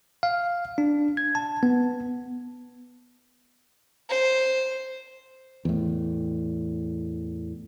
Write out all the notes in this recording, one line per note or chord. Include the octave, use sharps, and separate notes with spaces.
F5
D4
G#6
A5
B3
C5
E2 A2